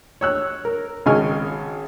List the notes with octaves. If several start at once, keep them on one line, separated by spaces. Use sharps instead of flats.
C#5 E6 F#6
A#4
G#1 C#3 D#5 G#5 C#6 F6